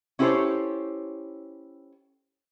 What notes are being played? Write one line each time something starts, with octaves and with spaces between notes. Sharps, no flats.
C#4 E4 G4 A4 C5 C#5